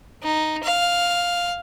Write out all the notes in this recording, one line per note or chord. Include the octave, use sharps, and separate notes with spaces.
D#4
F5